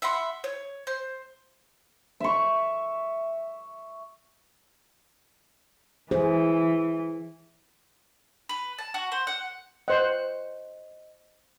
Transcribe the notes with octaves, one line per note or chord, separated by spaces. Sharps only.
E5 F#5 B5 C6
C#5
C5
E5 C#6
E3 G#4 C5
B4
A5
F#4
C5
F#5
C5 D#5 F#5